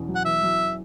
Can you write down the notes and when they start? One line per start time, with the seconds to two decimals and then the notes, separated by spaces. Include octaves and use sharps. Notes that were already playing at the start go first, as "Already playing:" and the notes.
Already playing: E2 B2 C#4
0.08 F#3
0.15 F#5
0.25 E2 E5
0.43 F#3